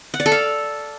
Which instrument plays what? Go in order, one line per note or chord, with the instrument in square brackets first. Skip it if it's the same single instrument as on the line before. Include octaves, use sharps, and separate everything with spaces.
[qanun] F#5
D5
A4
F5